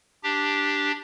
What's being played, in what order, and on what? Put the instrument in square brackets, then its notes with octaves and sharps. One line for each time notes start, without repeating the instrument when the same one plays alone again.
[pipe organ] D4 G4